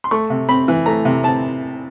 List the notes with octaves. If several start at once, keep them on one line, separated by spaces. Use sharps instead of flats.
C6
A3 C#6
C3
C4 B5
E3
A3 A#5
C3
C4 A5